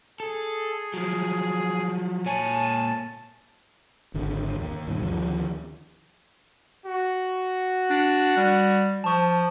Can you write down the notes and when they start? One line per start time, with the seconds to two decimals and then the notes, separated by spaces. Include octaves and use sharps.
0.20 G#4 A4
0.94 F3 F#3
2.26 A#2 C#5 G#5 A5
4.14 G#1 D3 D#3
4.60 D#2
4.87 G2 B2 D#3
5.02 D2 D#3 F3
6.86 F#4
7.90 D4
8.37 G3
9.04 F3 A5 C#6